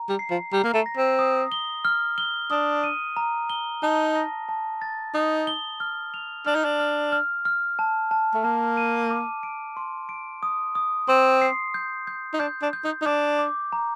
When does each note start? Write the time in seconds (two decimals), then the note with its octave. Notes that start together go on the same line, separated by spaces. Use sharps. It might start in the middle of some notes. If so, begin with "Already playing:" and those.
Already playing: A#5
0.09 G3
0.19 C7
0.31 F3
0.53 G3 A#5
0.64 A#3
0.74 A3
0.86 A#6
0.97 C4
1.19 D#6
1.52 G7
1.85 F6
2.18 G7
2.51 D4 D#6
2.84 D#7
3.17 A#5
3.50 G7
3.83 D#4 A5
4.15 A#6
4.49 A5
4.82 A6
5.14 D#4 D#6
5.47 G7
5.80 F6
6.14 F7
6.46 D4 F6
6.55 D#4
6.64 D4
6.80 F6
7.12 F6
7.45 F6
7.79 A5
8.11 A5
8.34 A3
8.44 A#3 A5
8.77 D#7
9.11 D6
9.43 D7
9.77 C6
10.09 D7
10.43 D#6
10.75 D#6
11.08 C4 C6
11.42 C7
11.74 G6
12.07 G6
12.33 D#4
12.40 D4 G6
12.62 D4
12.73 G6
12.84 D#4
13.02 D#4
13.06 D4 D6
13.39 D6
13.72 A#5